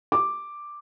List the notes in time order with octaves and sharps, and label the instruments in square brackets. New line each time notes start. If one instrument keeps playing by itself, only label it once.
[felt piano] D6